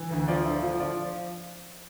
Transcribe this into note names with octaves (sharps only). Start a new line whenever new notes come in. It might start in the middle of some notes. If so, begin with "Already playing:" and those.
Already playing: E3
D2
F3 D5
D3 E4
F3 F4
F3 D5